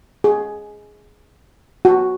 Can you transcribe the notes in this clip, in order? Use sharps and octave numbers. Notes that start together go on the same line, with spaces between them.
G#4
F#4